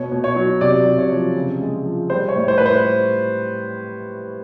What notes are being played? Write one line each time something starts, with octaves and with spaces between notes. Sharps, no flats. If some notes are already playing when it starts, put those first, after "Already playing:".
Already playing: B2 C#5
B2
C#5
F#3
C3 D5
C3
C#5
F3
C#3
G#3
F3
G3 C5
C#5
A2
C5
A2 B4
C5